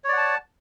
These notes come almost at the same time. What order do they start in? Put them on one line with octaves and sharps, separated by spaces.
C#5 D5 F#5 A5